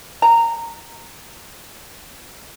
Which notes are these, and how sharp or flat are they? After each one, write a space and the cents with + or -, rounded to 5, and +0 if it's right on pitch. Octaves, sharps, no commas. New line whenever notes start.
A#5 -15